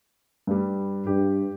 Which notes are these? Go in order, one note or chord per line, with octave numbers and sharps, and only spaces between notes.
G2 G3
G2 G4